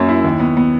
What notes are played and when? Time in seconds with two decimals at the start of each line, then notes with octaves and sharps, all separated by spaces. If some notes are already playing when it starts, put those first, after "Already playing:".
Already playing: F#2 F#3 A#3 C#5
0.09 E4
0.24 D#2
0.40 B3
0.57 B3